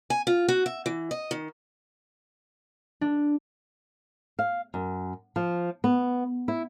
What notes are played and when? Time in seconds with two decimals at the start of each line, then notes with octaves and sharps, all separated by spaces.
0.10 G#5
0.27 F4
0.48 F#4
0.66 E5
0.86 E3
1.11 D#5
1.31 D#3
3.01 D4
4.39 F5
4.74 F#2
5.36 F3
5.84 B3
6.48 E4